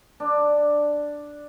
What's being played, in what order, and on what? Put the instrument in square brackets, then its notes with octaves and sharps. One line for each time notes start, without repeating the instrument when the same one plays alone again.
[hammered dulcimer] D4